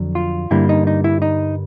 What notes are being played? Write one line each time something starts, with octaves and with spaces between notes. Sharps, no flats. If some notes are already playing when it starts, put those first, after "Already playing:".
Already playing: F2 D3 F#3
F4
G2 D3 G3 A#3 E4
D#4
D#4
E4
D#4